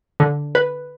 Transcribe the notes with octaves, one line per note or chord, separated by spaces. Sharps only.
D3
B4